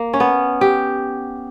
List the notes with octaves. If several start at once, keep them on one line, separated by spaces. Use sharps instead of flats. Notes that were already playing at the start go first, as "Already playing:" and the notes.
Already playing: A#3
C#4
B3
G4